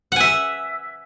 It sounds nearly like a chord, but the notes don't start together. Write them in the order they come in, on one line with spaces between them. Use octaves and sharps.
F#5 G#5 E5